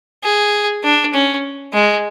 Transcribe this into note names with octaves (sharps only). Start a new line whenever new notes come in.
G#4
D4
C#4
G#3